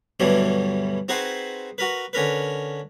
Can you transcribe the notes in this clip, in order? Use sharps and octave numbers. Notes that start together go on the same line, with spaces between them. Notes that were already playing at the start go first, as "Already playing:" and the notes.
D2 G2 B2 E3 F#3 G3
C4 D#4 F#4 G#4 B4 C5
F#4 A#4 B4
D3 C#4 A#4 B4